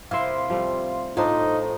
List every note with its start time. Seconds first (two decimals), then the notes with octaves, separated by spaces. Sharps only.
0.11 C3 E4 A#4 E5 F5 C6
0.50 F3 G3 A3
1.17 A2 A3 C4 D4 D#4 F4 C5 C#5